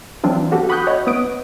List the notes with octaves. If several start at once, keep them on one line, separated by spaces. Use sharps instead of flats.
E3 F#3 C4 D4 F4
B3 F#4 G4 A4
F#5 B5 C#6 D#6 F#6 G6
C#5 D#5 E5 F#5
B3 B4 D#6 D7